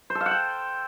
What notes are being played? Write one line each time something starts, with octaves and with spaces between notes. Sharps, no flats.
C5
A4
F5
F#5
G5